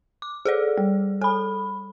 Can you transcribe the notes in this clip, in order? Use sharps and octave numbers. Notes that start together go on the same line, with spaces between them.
D6
G#4 A4 D5
G3
A4 G#5 B5